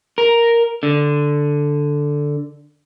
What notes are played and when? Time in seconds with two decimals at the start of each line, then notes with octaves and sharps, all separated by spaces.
0.18 A#4
0.83 D3